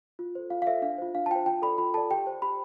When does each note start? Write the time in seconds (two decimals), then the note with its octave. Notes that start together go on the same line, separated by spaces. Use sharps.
0.19 F4
0.35 A4 C5
0.50 F4 F5
0.62 F5
0.67 A4 C5 E5
0.82 D4 F5
0.98 F4 C5
1.15 D4 F5
1.26 A5
1.31 F4 C5 G5
1.46 F4 G5
1.62 A4 D5 B5
1.78 F4 B5
1.94 A4 D5 A5
2.11 G4 G5
2.27 C5
2.42 G4 B5